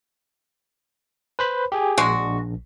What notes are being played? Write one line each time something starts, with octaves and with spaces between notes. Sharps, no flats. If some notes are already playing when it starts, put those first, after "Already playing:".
B4 C5 B5
G4 G#4 G#5
A#1 G#3 D4 F#4